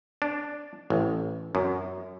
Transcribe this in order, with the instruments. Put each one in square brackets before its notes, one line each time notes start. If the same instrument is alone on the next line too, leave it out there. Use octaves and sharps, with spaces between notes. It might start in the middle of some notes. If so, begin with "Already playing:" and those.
[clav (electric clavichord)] D4
A1
F#2